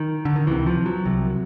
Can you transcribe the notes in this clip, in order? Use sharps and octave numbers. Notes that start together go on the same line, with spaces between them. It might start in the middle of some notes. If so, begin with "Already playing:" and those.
Already playing: D#3
D3
D#3
C#2 C3 E3
F3
F#3
C2 C3